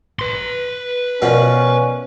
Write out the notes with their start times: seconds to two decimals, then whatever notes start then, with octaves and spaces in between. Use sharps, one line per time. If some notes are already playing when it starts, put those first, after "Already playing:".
0.19 B4 C6
1.22 B2 F3 C#4 A#4 D5 F#5